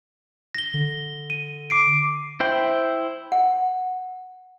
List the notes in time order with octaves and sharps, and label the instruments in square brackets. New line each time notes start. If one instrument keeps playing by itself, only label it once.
[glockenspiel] A#6 G7
[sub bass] D3
[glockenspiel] D#7
D6 C7 D7
[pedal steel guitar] E4 C5 G5
[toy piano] F#5